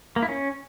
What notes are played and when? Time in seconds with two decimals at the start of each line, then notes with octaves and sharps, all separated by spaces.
0.16 A#3
0.22 E4
0.29 C#4